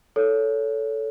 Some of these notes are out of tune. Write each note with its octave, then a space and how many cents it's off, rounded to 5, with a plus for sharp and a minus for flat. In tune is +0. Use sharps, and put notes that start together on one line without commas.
A4 +0 C#5 +25